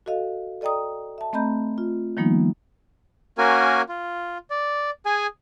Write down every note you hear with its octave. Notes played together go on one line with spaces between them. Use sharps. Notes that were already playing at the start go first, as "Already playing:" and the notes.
F#4 A4 D#5 F5
A4 D5 D#5 G5 A#5 D#6
E5 A5
A3 C4 D#5 A#5 B5 G6
F4
D#3 F3 G3 A#3 B3 D#4
A#3 C#4 F#4 A#4 G#5
F4
D5
G#4 G#5